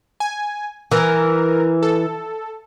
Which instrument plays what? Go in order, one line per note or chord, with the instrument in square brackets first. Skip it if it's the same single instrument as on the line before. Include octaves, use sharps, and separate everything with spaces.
[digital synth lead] G#5
[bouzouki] E3 [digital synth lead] A#4
[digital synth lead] A4